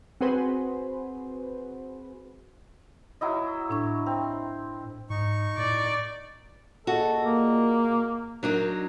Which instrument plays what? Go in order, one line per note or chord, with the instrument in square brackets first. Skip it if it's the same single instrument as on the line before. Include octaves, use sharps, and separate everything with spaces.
[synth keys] C4 F#4 G#4 B4 C5
[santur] F#3 E4 D#5
[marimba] A2 D4 C#6
[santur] C4
[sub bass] G#2 [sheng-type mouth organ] D#4 C#6
[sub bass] A2 [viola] D5
[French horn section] A#2 G#4 D#5 [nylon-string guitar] F#4 [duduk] A4
[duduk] A#3
[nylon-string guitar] F#3 D4 D#4 [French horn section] A#4